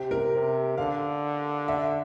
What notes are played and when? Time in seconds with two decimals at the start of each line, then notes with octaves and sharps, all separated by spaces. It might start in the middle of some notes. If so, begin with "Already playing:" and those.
Already playing: C3 G4
0.11 A#4
0.33 C3
0.78 D3 F5
1.68 E5